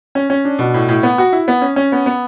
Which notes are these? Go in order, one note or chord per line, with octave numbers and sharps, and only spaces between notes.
C#4
C#4
D4
B2
A2
A2
B3
F#4
E4
B3
C#4
C#4
B3
B3